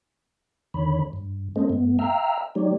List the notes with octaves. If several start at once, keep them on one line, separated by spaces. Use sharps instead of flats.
E2 D3 D#3 C#5 B5
G2
G#3 A#3 C#4 A4 C5 D#5
G2 A3 B3
E5 F5 G5 A#5 E6 F6
F#3 A3 D#4 G4 C#5 D5